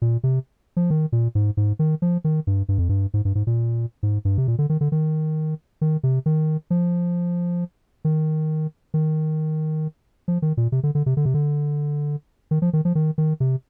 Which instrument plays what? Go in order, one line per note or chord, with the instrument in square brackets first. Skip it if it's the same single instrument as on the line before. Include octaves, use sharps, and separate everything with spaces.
[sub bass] A#2
C3
F3
D#3
A#2
G#2
G#2
D#3
F3
D#3
G2
G2
F2
G2
G#2
G2
G#2
A#2
G#2
G2
C3
A#2
D3
D#3
D3
D#3
D#3
C3
D#3
F3
D#3
D#3
F3
D#3
A#2
C3
D3
D3
C3
D3
C3
D3
D#3
F3
D#3
F3
D#3
D#3
C3